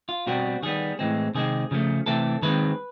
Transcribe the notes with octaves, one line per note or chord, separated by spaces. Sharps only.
F4
B2 G3 C4 F#4
D#3 G3 B3 G#4
A2 E3 G#3 C4
C3 D#3 G#3 C4 G#4
C#3 F3 A3
C3 E3 A3 C4 A4
D#3 G#3 C4 B4